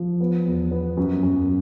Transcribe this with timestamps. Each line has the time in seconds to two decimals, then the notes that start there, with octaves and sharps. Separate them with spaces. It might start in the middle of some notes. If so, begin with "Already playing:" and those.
Already playing: F3
0.20 B3
0.46 E2
0.71 B3
0.97 F#2
1.23 F#2